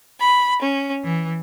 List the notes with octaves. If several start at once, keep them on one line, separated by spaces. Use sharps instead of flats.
B5
C#4
E3